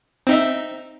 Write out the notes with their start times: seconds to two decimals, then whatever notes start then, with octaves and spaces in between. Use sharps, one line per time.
0.27 C4 D#4 E5